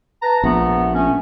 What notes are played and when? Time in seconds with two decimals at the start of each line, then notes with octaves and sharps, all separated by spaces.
0.22 B4 A5 A#5
0.44 A#1 A3 B3
0.95 A3 C#4